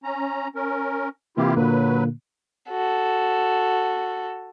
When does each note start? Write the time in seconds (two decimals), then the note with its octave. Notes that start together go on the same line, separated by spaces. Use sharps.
0.04 C#4 A#5
0.55 C#4 A#4
1.37 C3 E3 A#3 E4 F4 G4
1.56 A#2 D3 F#3 A#3 B4
2.70 F#4 A4